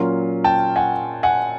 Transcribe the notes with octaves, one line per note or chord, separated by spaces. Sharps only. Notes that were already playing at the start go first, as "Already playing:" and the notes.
Already playing: A#2 F#3 A#3 C#4 F4
G5 A5
F#5 G#5
F#5 G#5